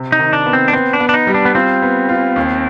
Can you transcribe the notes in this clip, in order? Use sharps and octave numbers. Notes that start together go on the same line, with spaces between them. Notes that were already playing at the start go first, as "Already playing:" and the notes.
Already playing: C3
D#4
D#3
D4
B3
C4
D4
B3 C4
D4
B3
D4
D#4
G3
D4
B3
C4 F4
B3
F4
D#2